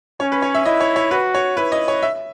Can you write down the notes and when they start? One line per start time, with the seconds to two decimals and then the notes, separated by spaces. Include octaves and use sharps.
0.20 C#4 C#5
0.32 B4
0.42 C#5
0.55 E5
0.66 E4 D#5
0.81 C#5
0.96 C#5
1.11 F#4 B4
1.35 C#5
1.57 E4 B4
1.72 D#5
1.88 C#5
2.02 E5